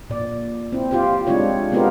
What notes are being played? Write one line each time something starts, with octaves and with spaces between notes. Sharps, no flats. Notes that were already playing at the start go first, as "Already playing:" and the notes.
A#2 D5
C4 E4
F4 G4 C5
G#3 C4 D4 E4 F4 C#5
G#3 B3 C4 F4 G4 A#4